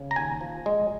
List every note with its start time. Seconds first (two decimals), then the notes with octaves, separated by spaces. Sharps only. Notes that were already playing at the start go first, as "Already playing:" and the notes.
Already playing: C#3
0.11 A#5
0.16 D#2 G#5
0.41 F3
0.66 G#3